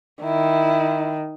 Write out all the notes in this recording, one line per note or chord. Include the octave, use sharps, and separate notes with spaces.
D#3 E4